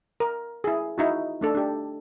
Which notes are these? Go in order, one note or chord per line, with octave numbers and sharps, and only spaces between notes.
A#4
E4 G#4
D#4 E4 F#4
A3 D4 A4
D4 G4